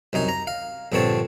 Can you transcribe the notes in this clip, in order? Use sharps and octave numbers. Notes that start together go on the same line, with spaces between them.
C2 F#2 D#4 G#5
A#5
F5
A#1 G2 D3 C4 C#5 A5